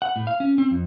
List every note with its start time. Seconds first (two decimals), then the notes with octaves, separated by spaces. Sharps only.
0.02 F#5
0.16 A2
0.27 F5
0.40 C#4
0.58 C4
0.71 F2